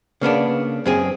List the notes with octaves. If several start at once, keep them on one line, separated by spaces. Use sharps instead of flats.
C#3 A#3 B3 D4
F#2 C4 G#4